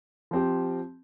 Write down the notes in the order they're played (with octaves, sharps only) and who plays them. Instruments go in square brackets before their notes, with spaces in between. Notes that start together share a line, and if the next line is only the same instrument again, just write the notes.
[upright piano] F3 C4 G4